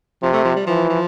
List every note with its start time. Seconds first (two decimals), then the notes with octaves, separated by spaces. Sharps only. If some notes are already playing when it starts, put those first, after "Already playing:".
0.23 C3 F3
0.33 A3
0.45 F3
0.56 G3
0.67 E3 F3
0.90 F3